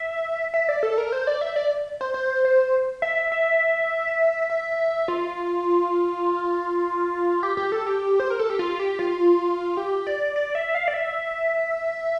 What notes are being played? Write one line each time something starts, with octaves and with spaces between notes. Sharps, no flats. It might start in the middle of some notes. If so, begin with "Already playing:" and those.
Already playing: E5
E5
D5
A4
A#4
C5
D5
E5
D5
C5
C5
C5
E5
E5
E5
F4
G4
G4
A4
G4
C5
A#4
A4
G4
F4
G4
F4
G4
D5
D5
E5
F5
D5
E5